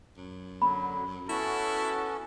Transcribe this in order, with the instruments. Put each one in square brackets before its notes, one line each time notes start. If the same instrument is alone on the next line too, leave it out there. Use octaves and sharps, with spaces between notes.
[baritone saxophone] F#2
[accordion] D3 F#3 [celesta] B5
[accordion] B3 C#4 F#4 [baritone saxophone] E4 [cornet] A4